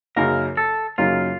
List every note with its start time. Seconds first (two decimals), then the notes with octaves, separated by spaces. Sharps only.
0.16 F#2 C#3 F#3 A#3 D#4 A#4
0.57 A4
0.98 F#2 C#3 F#3 A#3 D#4 F4